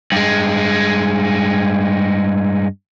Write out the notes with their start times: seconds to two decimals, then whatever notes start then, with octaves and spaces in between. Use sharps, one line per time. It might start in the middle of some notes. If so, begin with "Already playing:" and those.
0.12 G2 G#3